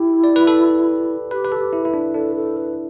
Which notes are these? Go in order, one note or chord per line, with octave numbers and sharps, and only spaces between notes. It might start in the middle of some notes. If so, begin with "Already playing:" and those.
Already playing: E4 G4
D5
B4
A4
G4 B4
B4
A4
G4
E4
E4 B4
D4
D4 A4
A4
B4